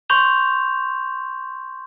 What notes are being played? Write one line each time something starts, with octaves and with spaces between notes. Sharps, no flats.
C6 C#6 G6 F7